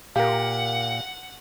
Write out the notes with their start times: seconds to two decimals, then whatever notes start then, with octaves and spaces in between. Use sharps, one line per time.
0.16 A#2 G4 A#4 F5 F#5